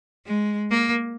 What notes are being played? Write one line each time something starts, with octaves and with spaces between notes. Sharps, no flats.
G#3
A#3